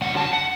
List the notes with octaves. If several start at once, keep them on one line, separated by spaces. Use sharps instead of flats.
F#2 D3 F#3 F#5
A5
F#5